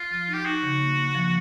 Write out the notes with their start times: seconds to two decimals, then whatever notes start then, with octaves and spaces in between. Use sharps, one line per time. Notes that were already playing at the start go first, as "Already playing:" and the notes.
Already playing: F4
0.11 F3
0.28 D#4
0.33 G4
0.45 D#4 F#4
0.63 C#3
0.81 A#3
0.98 A#3
1.15 F3